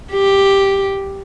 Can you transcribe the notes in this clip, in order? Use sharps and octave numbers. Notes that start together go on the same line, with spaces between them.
G4